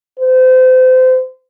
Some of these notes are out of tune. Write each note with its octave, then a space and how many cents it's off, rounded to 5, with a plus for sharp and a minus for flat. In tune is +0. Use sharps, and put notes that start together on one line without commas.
C5 -30